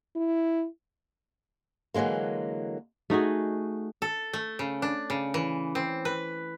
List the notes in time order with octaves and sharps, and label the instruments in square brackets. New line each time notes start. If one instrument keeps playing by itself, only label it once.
[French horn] E4
[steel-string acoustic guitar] D3 E3 F#3 G#3 A#3
[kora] A3 D#4 F#4 G#4
[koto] A4
A3
C#3
D4
C#3
E3
C4
B4